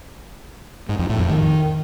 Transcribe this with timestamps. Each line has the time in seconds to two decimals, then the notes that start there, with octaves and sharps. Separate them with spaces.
0.89 G#2
0.99 F2
1.09 A2
1.19 F2
1.30 D#3